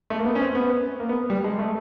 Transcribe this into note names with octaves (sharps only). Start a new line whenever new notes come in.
A3
A#3
B3
C#4
C4
B3
A#3
B3
G3
G#3
A3